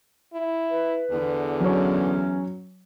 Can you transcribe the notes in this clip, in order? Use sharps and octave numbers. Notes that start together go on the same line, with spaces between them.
E4
B4
E2 D3
F#3 C#4 C#5